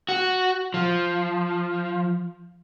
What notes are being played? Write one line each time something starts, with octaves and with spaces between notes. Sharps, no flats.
F#4
F3